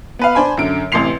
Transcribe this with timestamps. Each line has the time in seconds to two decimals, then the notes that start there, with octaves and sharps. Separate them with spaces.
0.19 B3 B4 F5
0.35 D4 C5 G#5 B5
0.57 F#2 D3 D7
0.92 A1 C3 E3 C6 C7 F7